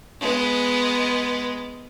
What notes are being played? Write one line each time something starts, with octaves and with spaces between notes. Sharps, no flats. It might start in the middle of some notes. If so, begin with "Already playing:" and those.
G#3 B3